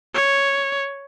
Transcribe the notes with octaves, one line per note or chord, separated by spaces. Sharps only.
C#5